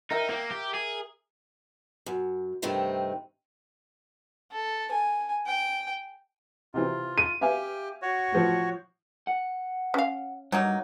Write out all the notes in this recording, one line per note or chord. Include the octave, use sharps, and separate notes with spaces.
D#4 A#4 E5 G5
A#3 G5
G4
G#4
F#2
G2 C3 D#3 A3 C4
A4
G#5
G5
C3 E3 C4 F4
D#7
G4 E5 F5 G#5
F#4 C#5
A2 F3
F#5
C#4 F5
G2 F#3 A#3 D#4